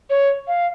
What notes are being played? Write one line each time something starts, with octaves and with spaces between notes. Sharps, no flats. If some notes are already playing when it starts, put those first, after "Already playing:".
C#5
F5